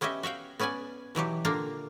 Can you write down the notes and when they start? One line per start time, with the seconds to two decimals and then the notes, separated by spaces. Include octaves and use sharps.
0.01 B3 C#4 G4 D#5 E5
0.23 F#4 E5 F5 G5
0.60 B3 C#4 B4 D5 G#5
1.15 B2 E3 F#3 G4
1.45 A#2 D3 A#3 D4 F5 A#5